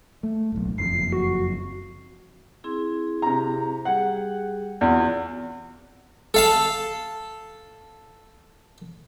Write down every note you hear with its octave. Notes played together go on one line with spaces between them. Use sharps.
A3
D1 B1
F#1 F2 C7
F#4
C4 E4 G#4
C3 A#5
G3 G4 G#4 F#5
E2 C4 F4 F#4
A4 F5 A5